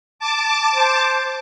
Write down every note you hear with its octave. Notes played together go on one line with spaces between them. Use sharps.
A5 D6
C5